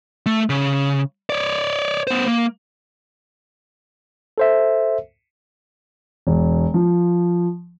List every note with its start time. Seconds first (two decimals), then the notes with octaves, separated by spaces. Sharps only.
0.26 A3
0.50 C#3
1.30 C#5 D5
2.07 B3 C5
2.26 A#3
4.38 A4 C5 E5
6.27 E1
6.74 F3